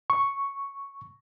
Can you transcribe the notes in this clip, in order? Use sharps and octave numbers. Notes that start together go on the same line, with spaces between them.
C#6